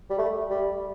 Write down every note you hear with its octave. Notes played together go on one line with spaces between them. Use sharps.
G3
A3
G3